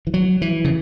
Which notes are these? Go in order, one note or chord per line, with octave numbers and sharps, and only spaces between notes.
E3
F#3
E3
C#3